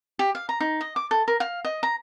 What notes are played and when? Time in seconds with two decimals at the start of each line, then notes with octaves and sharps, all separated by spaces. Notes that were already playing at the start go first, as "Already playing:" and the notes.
0.19 G4
0.35 F5
0.49 A#5
0.60 D#4
0.81 D#5
0.96 D6
1.11 A4
1.28 A#4
1.40 F5
1.65 D#5
1.83 A#5